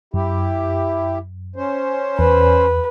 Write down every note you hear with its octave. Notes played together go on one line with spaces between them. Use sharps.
F#2 E4 G4
C#4 C5
E2 B4